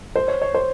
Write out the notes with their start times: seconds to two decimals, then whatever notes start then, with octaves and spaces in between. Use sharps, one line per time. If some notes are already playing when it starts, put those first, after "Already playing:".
0.16 C5
0.28 C#5
0.42 C#5
0.54 C5